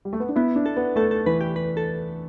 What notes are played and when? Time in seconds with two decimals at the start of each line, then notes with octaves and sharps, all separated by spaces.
0.05 G3
0.13 A3
0.20 B3
0.29 D4
0.36 B3 E4
0.56 D4
0.66 A4
0.77 B3
0.96 A3 A4
1.11 A4
1.26 E3 B4
1.41 G4
1.56 B4
1.77 A4